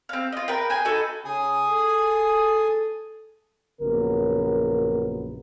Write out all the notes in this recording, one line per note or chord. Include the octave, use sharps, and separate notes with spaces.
C4 F5
F4 D#5
A#4 B4 G5
G#4 G5 G#5
D#4 F#4 A4 B4
C#3 G#4 G#5 D#6
A4
A#1 F#2 C#3 B3 A#4